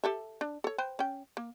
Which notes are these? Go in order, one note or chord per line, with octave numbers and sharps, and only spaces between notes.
G4 A4 E5
D4
A4 C#5
B4 C5 G5
C#4 G5
A#3